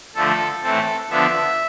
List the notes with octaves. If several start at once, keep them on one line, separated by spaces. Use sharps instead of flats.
D3 F3 A3 A4
A2 E3 A3 C4 A4
D3 F3 B3 D4 E5